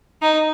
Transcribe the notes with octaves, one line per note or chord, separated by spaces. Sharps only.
D#4